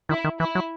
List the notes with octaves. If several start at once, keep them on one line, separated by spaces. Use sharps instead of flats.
D#3 E4
D#3
E3 E4
F#3